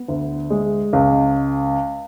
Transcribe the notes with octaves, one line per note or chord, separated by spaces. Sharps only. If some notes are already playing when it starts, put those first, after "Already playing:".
Already playing: B3
D2
G#3
C#2